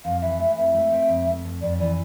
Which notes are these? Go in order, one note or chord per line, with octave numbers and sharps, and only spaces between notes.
F2 F5
E3 E5
A3 E5
F2 E5
A3
C4
F2
A3
F2
F2 D5
E3 D5